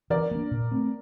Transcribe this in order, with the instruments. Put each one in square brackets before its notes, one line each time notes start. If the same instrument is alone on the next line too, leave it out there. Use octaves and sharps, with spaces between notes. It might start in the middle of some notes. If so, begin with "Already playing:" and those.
[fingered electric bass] E3 [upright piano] A#4 D5
[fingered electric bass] A#3 D4
A#2
A3 C4